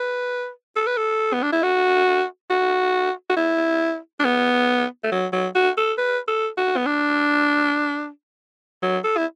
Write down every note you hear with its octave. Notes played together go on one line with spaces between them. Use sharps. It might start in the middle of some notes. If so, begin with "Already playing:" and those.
Already playing: B4
A4
B4
A4
B3
D4
E4
F#4
F#4
F#4
E4
D4
B3
A3
F#3
F#3
F#4
A4
B4
A4
F#4
B3
D4
F#3
A4
E4